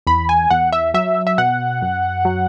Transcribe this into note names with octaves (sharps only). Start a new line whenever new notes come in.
E2 B5
G#5
E2 F#5
E5
F#3 E5
E5
B2 F#5
F#2
F#3